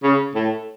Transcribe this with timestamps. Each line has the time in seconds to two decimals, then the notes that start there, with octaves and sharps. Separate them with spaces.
0.03 C#3
0.35 A2